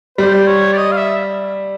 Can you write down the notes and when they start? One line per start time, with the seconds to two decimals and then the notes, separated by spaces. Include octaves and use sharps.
0.18 G3 C5
0.48 C#5
0.73 D5
0.78 D#5
0.92 F5
0.97 E5